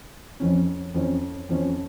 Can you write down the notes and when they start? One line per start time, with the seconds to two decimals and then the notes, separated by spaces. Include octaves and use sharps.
0.40 F2 F3 C#4
0.94 F2 F3 C#4
1.49 F2 F3 C#4